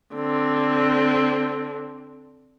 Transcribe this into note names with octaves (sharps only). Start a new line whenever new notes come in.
D3 C4